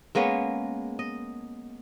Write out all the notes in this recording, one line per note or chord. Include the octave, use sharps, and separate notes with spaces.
G#3 A#3 B3 C#4
D#5